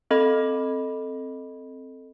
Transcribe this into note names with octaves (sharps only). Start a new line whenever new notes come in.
C4 A4 D#5 B5